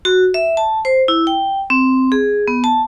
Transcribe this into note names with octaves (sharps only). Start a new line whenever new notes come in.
F#4
E5
A5
C5
E4
G5
C4
G#4
B3
A5